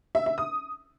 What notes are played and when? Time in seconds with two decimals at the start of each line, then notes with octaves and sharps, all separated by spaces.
0.15 E5
0.26 E5
0.38 D#6